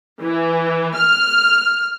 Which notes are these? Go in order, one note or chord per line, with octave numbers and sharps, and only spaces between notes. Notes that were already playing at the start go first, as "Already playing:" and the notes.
E3
F6